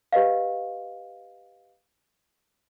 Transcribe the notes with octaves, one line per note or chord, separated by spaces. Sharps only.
G4 B4 D#5 F5